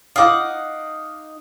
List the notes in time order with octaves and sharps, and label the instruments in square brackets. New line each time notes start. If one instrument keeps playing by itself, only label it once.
[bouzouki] D#4 F#5 [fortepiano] F5 D6